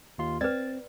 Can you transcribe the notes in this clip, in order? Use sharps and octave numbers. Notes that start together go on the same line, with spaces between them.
D#2 F4 C6
C4 B4 D5 A6